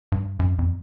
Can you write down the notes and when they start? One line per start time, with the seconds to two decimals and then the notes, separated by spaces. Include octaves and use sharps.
0.12 G2
0.39 F#2
0.59 F2